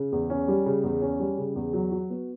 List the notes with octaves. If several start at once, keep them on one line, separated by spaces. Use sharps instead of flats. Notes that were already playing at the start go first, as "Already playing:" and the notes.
Already playing: C#3
E2
C#4
G3
C#3
E2
C#4
G3
C#3
E2
F#3
F#4
B3